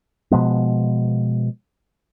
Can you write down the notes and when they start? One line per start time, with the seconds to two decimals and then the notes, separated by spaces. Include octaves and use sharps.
0.31 B2 F3 G#3 B3